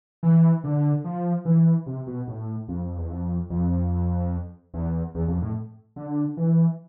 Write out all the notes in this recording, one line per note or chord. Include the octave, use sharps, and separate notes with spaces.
E3
D3
F3
E3
C3
B2
A2
F2
E2
F2
F2
E2
E2
F2
A2
D3
E3